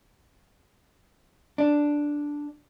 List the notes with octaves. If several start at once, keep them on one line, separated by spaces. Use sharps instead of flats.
D4